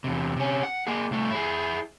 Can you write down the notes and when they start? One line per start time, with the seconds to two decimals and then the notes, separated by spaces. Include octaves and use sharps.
0.04 E2 C3
0.36 C3 C#4
0.63 F#5
0.87 A#3 G#4
1.11 C2 A3
1.31 E4 G#4